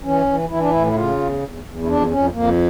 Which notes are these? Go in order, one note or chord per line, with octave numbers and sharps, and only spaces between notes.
E3 C#4
E3
E3 E4
D4
A2 E4
E4
C#3 F4
E2
E2
E2
E4
F2 D4
F2 C#4
F2 A#3